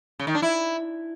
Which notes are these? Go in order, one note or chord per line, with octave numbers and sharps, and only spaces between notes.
C#3
D#3
D4
E4